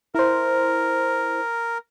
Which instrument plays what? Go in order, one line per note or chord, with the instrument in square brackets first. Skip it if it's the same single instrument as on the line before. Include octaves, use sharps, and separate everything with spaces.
[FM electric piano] E4 C5 [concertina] A#4